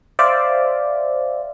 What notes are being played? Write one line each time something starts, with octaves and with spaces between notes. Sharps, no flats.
C5 D5 E5 F5